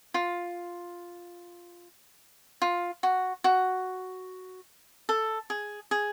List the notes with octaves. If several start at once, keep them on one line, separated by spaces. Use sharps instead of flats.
F4
F4
F#4
F#4
A4
G#4
G#4